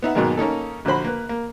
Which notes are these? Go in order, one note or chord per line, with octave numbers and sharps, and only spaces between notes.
B3 D#4 E5 F#5
G#2 B2 D#3 F#3 G#3 A#3
A#3 C#4 D#4 A4
A#1 D3 F#4 C5 B5
A#3 B4
A#3